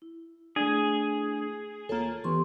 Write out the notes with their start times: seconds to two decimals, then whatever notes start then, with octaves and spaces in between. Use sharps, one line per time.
0.02 E4
0.56 A3 D4 G#4
1.89 D#2 A#3 F4 A4 C#5 A#5
2.24 F2 E3 B3 G4 C6 C#6